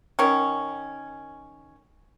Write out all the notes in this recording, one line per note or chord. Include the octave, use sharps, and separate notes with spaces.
D#3 C#4